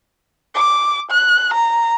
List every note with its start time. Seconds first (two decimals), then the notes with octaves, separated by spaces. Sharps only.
0.55 D6
1.11 F#6
1.54 A#5